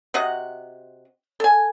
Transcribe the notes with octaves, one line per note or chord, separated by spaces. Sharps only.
C3 F#4 D#5 F#5
A4 G#5